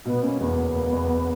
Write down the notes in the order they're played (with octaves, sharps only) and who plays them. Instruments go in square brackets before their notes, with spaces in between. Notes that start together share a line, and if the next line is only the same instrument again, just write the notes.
[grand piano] B2 [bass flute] B3
[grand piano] A#3 [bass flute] C#4
[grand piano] E2 [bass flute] B3
[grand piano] F#1
A#3
E2